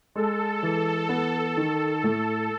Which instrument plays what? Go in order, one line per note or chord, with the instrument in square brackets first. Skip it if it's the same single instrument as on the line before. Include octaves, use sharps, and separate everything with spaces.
[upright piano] G#3 [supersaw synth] A4
[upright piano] E3
B3
D#3
A2